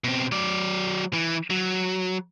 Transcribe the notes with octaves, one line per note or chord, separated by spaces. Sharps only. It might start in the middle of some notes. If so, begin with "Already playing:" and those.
B2 C4
F#3 D5
E3
F#3